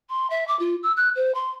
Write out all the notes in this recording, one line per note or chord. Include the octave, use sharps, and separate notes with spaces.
C6
E5
D6
F4
E6
F#6
C5
C6